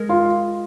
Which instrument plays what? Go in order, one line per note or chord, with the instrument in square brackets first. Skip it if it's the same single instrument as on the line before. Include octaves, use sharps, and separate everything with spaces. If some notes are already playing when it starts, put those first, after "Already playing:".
Already playing: [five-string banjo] G#3 A#4
[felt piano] F4